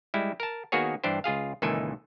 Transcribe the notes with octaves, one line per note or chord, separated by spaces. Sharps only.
G3 G#3 E4
A#4 A5
D#3 A#3 B3 F#4 G#4 C#5
G2 E3 D4 G4 C5
C#2 F4 G#4 F5
C#2 A#2 D#3 E3 A4 G#5